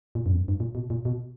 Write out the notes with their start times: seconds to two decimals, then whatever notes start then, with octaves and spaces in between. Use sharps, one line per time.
0.15 A#2
0.26 F#2
0.33 E2
0.37 F#2
0.48 G2
0.60 A#2
0.75 B2
0.90 A#2
1.05 B2